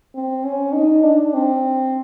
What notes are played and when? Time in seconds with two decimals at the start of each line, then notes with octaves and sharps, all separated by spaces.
0.15 C4
0.45 C#4
0.74 D#4
1.03 D4
1.34 C4